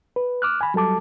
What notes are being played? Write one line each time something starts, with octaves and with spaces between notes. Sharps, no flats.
B4
D6 F6 F#6
G#5 B5
F#3 G3 A4 A5 D6